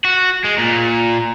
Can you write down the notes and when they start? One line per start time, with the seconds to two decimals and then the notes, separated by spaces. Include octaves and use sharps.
0.05 F#4
0.44 G#3
0.58 A#2